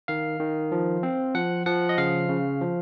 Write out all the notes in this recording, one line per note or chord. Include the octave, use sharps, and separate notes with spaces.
D#3 F5
D#3
F3
C4
F3 F#5
F3 F#5
D#5
C#3 F5
C#3
F3